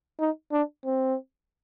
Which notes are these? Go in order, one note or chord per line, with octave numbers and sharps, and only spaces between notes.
D#4
D4
C4